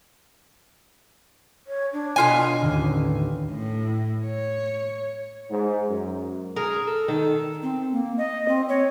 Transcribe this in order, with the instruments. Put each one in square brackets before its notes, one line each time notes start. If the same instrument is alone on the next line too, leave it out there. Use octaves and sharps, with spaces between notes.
[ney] C#5
D4
[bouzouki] B2 F4 G#5
[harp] A1 D#2 D3
[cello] A2
C#5
[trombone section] G#2
F#2
[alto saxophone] G#4 [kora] A#4
[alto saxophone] A4
[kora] D#3 [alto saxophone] A4
[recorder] C4
A#3
D#5
C4
C#5